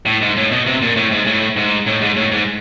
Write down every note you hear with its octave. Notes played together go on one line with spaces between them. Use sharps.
A2
G#2
A2
B2
C3
A#2
A2
G#2
A2
G#2
A2
G#2
A2
G#2